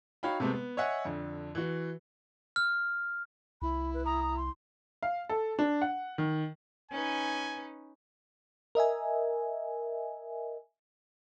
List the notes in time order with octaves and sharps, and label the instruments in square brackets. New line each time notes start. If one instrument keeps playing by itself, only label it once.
[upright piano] D#4 F#4 C#5 F5 G5 B5
C3 G#3 A3 B3 C4
B3
C#5 D#5 E5 F#5 G#5
F2 D3
E3 F#4
[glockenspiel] F6
[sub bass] C2 [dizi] E4 [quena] B5
[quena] B4
[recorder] A#5 [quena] D#6
[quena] D#6
C6
[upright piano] F5
A4
D4
F#5
D#3
[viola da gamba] C#4 D#4 B4 [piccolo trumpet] G#5
[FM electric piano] A#4 D#5 E5 G#5